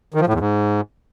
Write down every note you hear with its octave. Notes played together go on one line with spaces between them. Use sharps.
D#3
F3
A2
E2
G#2